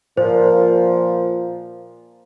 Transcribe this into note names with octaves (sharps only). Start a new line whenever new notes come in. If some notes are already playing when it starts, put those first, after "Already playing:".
A#2 F3 C5